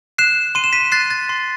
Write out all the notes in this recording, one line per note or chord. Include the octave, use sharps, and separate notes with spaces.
F#6 C7 E7
C6 D#7
E7
B6 D#7
F#6 A6 C7
A6
C6